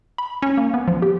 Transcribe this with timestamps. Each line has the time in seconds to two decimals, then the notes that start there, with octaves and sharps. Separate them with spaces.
0.18 B5
0.42 C#4
0.57 A#3
0.74 B3
0.88 F3
1.02 G4